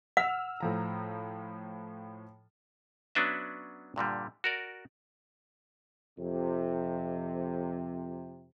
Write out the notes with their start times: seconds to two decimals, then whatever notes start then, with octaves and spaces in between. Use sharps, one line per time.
0.17 F#5 E6 F6 F7
0.60 A2 F3 A#5
3.15 F#3 B3 C#4 D4 B4 E5
3.96 G2 A#2 D3 G3
4.44 F#4 A#4 D5
6.19 F2 C3